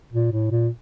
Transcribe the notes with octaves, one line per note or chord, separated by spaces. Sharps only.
A#2
A2
A#2